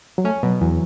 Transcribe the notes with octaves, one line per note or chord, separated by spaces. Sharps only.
F#3
A3 C#4
B2 F#3
E2 E3